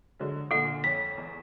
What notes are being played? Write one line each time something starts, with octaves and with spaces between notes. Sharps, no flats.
D3 F#3 G#3
A#2 D3 A4 F#5
F2 C#5 A6 B6
E2